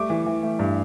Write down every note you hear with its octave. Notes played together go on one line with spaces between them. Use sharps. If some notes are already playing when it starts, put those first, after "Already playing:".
Already playing: G3 A3 D6
E3
E3
A3
G2